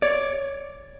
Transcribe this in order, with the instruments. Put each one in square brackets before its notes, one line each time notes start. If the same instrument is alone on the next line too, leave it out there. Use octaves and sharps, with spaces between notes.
[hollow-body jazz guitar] C#5 D5